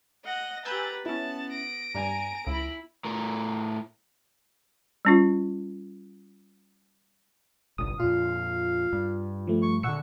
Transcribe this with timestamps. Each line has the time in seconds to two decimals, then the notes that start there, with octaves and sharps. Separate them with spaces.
0.25 D#5 F#5 A#6
0.65 G4 B4 G#5 A#5 E6 G6 A6
1.06 B3 C#4 E4 A5
1.52 A#6 D7
1.95 G2 G3 G#5 A#5
2.47 C#2 E4 B5
3.05 A2 A#4
5.05 G3 C#4 F4
7.78 G1 C2 G2 D#6
8.00 F2 A#2 F4 F5
8.93 G2
9.47 F3 A3
9.62 C#6
9.83 A#2 D3 F#5 C#6 E6 C#7